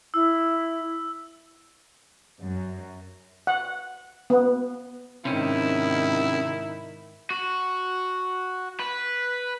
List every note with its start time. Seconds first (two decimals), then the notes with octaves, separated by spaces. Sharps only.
0.14 E4 E6
2.45 F#2
3.47 F#5
4.30 B3
5.25 G#2 C3 D#3 C#4 E4
7.30 F#4
8.80 B4